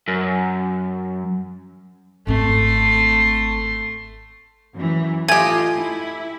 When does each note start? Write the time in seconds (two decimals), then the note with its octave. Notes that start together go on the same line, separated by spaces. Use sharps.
0.08 F#2
2.27 G#1 A3 C4 C6
4.74 F#2 E3
5.28 A3 F4 G4 D#5 G#5 G#6
5.77 E4